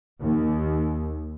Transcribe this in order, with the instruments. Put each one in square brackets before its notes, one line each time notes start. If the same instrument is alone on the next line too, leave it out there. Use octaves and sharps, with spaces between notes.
[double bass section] D#2